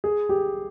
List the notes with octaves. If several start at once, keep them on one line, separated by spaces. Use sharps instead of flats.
G#4
G4